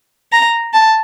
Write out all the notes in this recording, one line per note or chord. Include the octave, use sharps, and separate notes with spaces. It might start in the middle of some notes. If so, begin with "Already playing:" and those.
A#5
A5